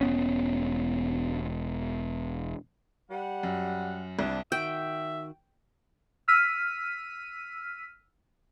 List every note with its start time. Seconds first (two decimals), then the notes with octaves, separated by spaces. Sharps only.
0.01 E1 B3 C#4
3.10 G3 F#5
3.43 F#2
4.19 C2 D4
4.52 D#3 F#4 E5 G5
6.28 E6 F6 B6 D#7